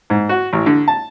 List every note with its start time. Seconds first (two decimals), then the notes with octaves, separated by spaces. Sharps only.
0.10 G#2
0.29 F#4
0.53 A1
0.66 D3
0.88 A5